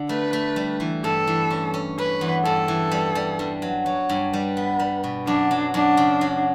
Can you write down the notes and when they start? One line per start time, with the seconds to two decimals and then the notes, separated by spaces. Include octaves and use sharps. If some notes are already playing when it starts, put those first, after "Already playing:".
Already playing: D3
0.09 A3 B4
0.33 A3
0.56 G3
0.80 E3
1.04 G2 A4
1.27 E3
1.51 C#4
1.74 C#4
1.98 C#4 B4
2.21 E2
2.45 G2 A4
2.68 E3
2.92 G3
3.15 G3
3.39 G2
3.62 F#3
3.86 F#3 C#5
4.09 G2
4.33 G3 B4
4.57 B3
4.79 G3
5.04 B2
5.27 F#2 D4
5.51 F#3
5.74 F#2 D4
5.97 C#3
6.21 F#3